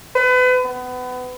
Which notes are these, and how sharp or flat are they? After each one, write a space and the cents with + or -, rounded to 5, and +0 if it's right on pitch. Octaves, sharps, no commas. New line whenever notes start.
B4 +35
B3 +25